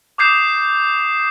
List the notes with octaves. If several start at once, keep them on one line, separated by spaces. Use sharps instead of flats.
D6 D#6 G6 C7 E7